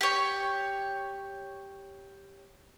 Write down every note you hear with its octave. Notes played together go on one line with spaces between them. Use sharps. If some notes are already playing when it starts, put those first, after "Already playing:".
G4 C#5